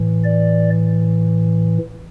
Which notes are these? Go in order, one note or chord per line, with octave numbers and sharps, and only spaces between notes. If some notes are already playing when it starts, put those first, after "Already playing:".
Already playing: A2 E3
D5